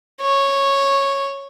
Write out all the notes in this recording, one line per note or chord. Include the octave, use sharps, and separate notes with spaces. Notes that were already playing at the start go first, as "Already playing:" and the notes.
C#5